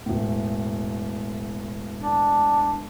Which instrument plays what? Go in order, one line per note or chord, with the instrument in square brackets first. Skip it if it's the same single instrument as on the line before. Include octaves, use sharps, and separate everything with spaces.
[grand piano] E1 A2
[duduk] D4